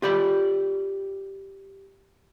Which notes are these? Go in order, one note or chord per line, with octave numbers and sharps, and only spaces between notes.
F4 G4 D5 B5